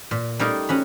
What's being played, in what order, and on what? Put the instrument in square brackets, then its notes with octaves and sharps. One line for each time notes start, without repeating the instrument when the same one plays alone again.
[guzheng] A#2
G3 A3 A#3 D#4 A#4
C#4 F#4 B5